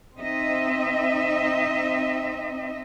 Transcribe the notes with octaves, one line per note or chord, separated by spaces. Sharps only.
C4 D#4 D#5 E5